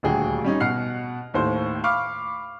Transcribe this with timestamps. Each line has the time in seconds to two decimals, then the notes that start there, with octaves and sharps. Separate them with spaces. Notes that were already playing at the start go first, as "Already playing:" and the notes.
0.03 D#1 D2 F#4 G#4 G5
0.44 G3 C#4 D#4
0.60 B2 F#5 F6 C7
1.34 D#2 A2 C5 C6
1.84 F5 B5 C#6 D6 F6